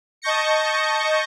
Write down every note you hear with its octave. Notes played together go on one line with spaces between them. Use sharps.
D#5 A5 C#6 G6 A#6 C#7